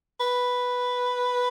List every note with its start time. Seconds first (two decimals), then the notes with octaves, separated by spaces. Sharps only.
0.20 B4